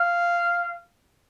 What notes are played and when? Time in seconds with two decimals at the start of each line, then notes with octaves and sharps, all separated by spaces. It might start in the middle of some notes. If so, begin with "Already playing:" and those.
Already playing: F5